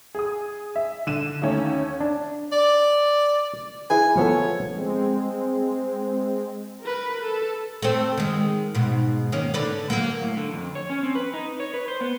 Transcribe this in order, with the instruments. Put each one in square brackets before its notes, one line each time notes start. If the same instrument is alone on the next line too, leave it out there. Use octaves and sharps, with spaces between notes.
[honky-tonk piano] G#4 D#6
E5
D3 D#7 E7
D#2 D#3 A3 C#4
[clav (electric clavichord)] D4
[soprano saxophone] D5
[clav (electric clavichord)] E4 G#4 B4 [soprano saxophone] G#5
[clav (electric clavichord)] F3 B3 A4 [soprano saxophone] C#5
[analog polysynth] G#3 C4
[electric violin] A#4 B4
A4
[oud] A3 C4
D#3 G#3
G#2 B2
D#3 A#3 C#4
D3 D4 B4
F#3 A#3
[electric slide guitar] A2
D3
F2
C#5
C#4
C4
B4
D#4
C#5
B4
C5
B3